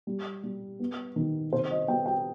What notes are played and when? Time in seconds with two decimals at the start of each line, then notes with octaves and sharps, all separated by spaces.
0.07 G3
0.43 G3
0.79 B3
1.16 D#3
1.52 C3 C5
1.70 D#5
1.88 B3 G5
2.06 G5